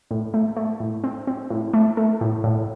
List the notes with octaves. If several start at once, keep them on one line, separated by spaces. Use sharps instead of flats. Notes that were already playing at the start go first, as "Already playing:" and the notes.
A2
A3
A3
A2
C4
C4
A2
A3
A3
A2
A2